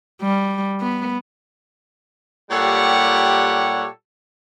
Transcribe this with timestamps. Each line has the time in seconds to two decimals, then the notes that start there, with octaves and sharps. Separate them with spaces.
0.22 G3
0.81 B3
2.51 A#2 G3 G4 A4 C#5 F#5